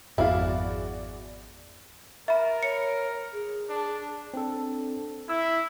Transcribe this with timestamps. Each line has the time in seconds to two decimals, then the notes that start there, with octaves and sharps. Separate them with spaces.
0.18 G#1 F2 B3 E4 F#4 G#4 D5 F5
2.28 A#4 E5 B5
2.63 C#5 C#7
3.33 G#4
3.69 D4
4.34 C4 D4 A4
5.29 E4 E6